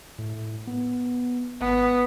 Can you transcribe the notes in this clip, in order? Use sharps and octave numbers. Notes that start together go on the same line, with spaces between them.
A2
B3
G#1 B3